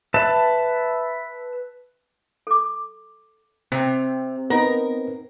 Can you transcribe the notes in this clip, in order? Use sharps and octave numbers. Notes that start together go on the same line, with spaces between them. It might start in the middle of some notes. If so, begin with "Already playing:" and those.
B4 E5 A5
A4 D6
C3 C4
B3 D#4 A#4